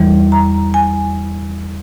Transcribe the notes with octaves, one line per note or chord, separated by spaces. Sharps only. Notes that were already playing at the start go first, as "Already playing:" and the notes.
Already playing: E2 E3 G3
A#5
G#5